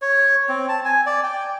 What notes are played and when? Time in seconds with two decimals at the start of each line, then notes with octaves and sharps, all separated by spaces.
0.02 C#5
0.49 C4
0.69 A5
0.85 G#5
1.06 D5
1.23 G5